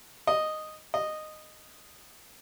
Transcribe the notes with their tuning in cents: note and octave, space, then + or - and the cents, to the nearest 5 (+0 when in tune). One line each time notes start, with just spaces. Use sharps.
D#5 -5
D#5 -10